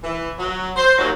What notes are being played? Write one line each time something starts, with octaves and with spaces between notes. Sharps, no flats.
E3
F#3
C5
D#2 F#3